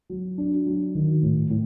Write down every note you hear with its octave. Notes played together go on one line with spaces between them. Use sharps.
F#3
D4
F#3
D#3
A2
A2